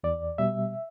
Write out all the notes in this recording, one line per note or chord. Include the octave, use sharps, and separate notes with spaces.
E2 D5
B2 G3 E5